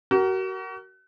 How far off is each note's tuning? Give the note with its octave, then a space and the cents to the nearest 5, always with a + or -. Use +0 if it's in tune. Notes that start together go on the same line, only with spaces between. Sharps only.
F#4 +35 A#4 +0